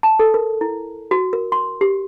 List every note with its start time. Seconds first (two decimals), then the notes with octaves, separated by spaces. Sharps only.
0.03 A5
0.19 A4
0.34 A#4
0.61 E4
1.11 F#4
1.33 A#4
1.52 C6
1.81 G4